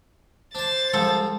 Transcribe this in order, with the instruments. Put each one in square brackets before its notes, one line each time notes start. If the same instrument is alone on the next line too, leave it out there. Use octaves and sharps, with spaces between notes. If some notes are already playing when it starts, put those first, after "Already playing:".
[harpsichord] D4 A5 [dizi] C5 [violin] A6
[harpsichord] C2 G#2 F3 [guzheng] A4